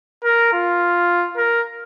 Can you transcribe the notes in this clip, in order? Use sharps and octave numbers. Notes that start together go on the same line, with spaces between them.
A#4
F4
A#4